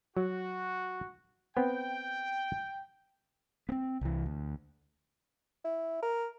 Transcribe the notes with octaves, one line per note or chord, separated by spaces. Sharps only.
F#3 F#4
B3 C4 G5
B3 C4
C2 E3
D2
E4
A#4